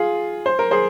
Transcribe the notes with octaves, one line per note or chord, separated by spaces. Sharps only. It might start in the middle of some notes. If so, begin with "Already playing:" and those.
Already playing: F4 G#4
C5
A#4
G#4 C5